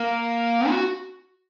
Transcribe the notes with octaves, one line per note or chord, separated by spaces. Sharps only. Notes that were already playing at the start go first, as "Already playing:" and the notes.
Already playing: A#3
F#4